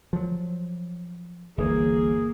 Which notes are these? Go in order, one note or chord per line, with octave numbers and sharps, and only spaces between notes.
F3 F#3
G1 D2 E3 A#3 G#4